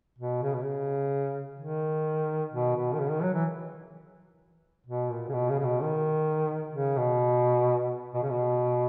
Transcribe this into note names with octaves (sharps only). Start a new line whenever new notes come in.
B2
C#3
B2
C#3
D#3
B2
B2
D#3
C#3
D#3
F#3
E3
B2
A#2
C#3
B2
C#3
C#3
B2
D#3
C#3
B2
B2
C#3
B2